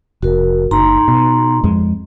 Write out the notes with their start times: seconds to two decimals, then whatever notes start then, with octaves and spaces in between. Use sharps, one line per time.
0.23 F1 F#4 A#4
0.71 F#1 D#4 A#5 C6
1.08 B2
1.64 F2 G#3